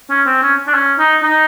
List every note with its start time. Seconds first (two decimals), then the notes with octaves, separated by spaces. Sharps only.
0.10 C#4
0.26 C4
0.42 C#4
0.67 D4
0.74 C#4
0.99 D#4
1.22 D#4